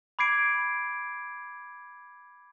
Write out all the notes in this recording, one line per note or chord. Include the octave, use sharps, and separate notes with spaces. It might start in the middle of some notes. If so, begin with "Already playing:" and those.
B5 D6 G#6 C7 D7